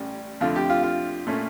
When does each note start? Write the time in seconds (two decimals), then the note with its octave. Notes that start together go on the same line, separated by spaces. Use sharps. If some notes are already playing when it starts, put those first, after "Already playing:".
Already playing: A1 A2 G3 C#4
0.41 F2 D3 A3 F4
0.56 G4
0.70 F4
0.83 F4
1.27 A#2 A3 C#4